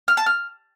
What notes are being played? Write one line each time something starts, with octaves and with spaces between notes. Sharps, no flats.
F6
A5
F6